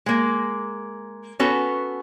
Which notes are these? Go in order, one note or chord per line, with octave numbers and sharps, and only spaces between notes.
G#3 A#3
B3 C#4 F#4 A4 B4